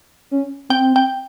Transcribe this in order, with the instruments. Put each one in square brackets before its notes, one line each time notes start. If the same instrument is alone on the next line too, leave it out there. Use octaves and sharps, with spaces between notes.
[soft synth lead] C#4
[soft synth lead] C4 [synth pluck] G5
[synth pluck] G5